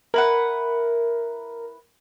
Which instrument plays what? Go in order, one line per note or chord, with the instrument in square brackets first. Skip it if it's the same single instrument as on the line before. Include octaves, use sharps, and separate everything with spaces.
[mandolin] E4 B4 F#5 [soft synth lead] A#4